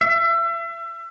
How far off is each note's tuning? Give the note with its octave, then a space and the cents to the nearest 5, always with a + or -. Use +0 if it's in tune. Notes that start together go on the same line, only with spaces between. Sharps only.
E5 +35